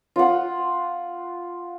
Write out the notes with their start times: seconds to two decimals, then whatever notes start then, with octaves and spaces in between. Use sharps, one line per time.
0.16 F4 F#5